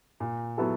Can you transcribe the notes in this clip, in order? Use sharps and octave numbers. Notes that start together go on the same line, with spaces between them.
A#2
F#3 B3 E4 A4